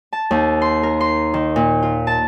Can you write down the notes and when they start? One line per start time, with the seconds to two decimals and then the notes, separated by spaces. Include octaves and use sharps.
0.13 A5
0.31 D#2
0.62 C6
0.83 A#4
1.01 C6
1.34 D#3
1.56 A#2
1.82 F4
2.07 A5